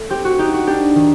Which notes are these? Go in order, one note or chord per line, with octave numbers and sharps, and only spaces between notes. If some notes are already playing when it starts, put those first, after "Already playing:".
Already playing: A3
C4 G4
F#4
D#4 G4
F#4
D4 G4
D#3